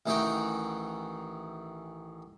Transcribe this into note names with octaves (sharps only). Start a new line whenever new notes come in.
A1 D#3 E3 D#4 F#4 G5